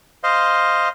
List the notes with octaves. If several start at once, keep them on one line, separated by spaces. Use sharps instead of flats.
C5 D#5 F5